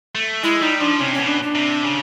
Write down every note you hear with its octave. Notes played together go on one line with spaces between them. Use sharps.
A3
G#3 E4
G3 D#4
F3 D4
C3 C#4
B2 C#4
D4
D4
C3
C#3